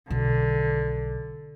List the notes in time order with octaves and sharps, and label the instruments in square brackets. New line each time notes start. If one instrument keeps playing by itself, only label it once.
[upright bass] B1 [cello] D3